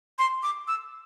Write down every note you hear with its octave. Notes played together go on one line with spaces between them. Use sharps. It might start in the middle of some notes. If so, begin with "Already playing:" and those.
C6
D6
E6